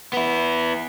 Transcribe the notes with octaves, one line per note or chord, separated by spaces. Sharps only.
B3 E4